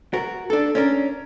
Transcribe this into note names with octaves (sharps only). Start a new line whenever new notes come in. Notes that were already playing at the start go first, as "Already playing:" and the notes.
F#4 A#4
D4 A4
C#4 D4 A#4